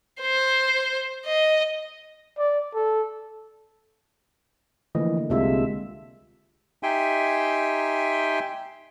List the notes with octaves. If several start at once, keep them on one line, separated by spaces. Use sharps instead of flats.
C5
D#5
D5
A4
D3 E3 F3 A3 A#3 D#5
C2 C3 G#3 D4 F4 E5
D#4 G4 E5 G5 G#5 C6